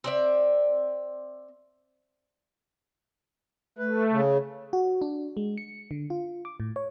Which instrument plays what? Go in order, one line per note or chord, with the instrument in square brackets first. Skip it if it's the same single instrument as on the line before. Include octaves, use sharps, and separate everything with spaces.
[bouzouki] C4 D5 E5
[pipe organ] A3 [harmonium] B4
[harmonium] C#3
[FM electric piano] F#4
D4
G#3
C#7
D3
F4
D6
A2
C#5